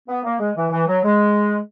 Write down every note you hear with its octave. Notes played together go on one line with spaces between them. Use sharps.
B3
A#3
G#3
E3
E3
F#3
G#3